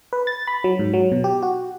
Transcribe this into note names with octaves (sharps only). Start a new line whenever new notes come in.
B4
A6
B5
F#3
G#2
F#3
B2
G4
F#4